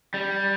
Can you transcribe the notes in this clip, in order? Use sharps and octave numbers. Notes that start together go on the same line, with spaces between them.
G3